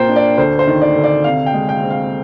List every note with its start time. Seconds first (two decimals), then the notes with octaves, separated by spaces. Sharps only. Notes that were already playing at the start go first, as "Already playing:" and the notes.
Already playing: A#2 A#3 C5 G5
0.09 D4
0.16 D5
0.38 D2 C5
0.59 C5
0.67 D#3
0.81 D5
0.96 D2
1.04 D5
1.24 C3 F5
1.46 G5
1.54 G#3
1.69 G5
1.82 C4
1.90 F5